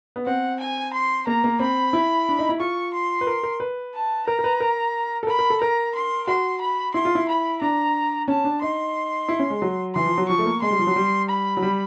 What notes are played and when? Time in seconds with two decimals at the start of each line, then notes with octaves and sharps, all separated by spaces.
0.16 B3
0.26 C4 F#5
0.59 G#5
0.93 C6
1.27 A#3 A#5
1.44 A#3
1.60 C4 B5
1.93 E4
2.29 D4
2.39 D#4
2.49 E4
2.60 F4 C#6
2.93 C6
3.21 B4
3.27 A#4
3.43 A#4
3.60 B4
3.94 A5
4.27 A#4 A#5
4.39 A#4
4.44 B4
4.60 A#4
5.23 A4
5.27 A#4 B5
5.39 A#4
5.50 A4
5.61 A#4 A#5
5.95 C6
6.27 F#4 C6
6.61 B5
6.94 E4 C6
7.05 F4
7.15 E4
7.29 B5
7.61 D4 A#5
8.28 C#4 A5
8.44 D4
8.62 D#4 C6
9.29 E4
9.39 C#4
9.50 G#3
9.62 F#3
9.95 E3 C6
10.06 F3
10.18 F#3
10.28 F3 C#6
10.39 A3
10.45 A#3
10.62 G#3 C6
10.71 G3
10.79 F3
10.87 F#3
10.96 G3
11.29 B5
11.57 F#3
11.62 G3